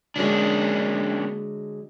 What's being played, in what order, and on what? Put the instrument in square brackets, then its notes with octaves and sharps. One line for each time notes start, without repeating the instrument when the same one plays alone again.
[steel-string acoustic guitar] D3 F#3 G#3 [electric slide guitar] A#3 C#4 D4